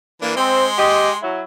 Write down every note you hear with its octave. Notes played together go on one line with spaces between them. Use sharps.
E3 A#3 D4
G#3 C4 C6
G4 D#5
F#3 E4